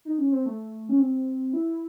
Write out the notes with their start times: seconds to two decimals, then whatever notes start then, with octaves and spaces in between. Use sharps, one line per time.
0.05 D#4
0.18 C#4
0.32 C4
0.46 A3
0.89 C#4
1.00 C4
1.53 E4